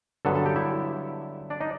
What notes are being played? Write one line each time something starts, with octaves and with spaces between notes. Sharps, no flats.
G2 D3 F#3 B3 A4 A5
A4 A5
G4 G5
E4 E5
D4 D5
D#4 D#5